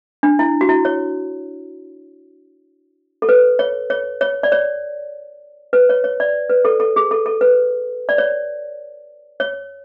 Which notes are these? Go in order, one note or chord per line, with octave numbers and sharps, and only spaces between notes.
D4
E4
F#4
E4
C#5
A4
B4
C#5
C#5
C#5
D5
C#5
B4
C#5
C#5
D5
B4
A4
A4
G#4
A4
A4
B4
D5
C#5
C#5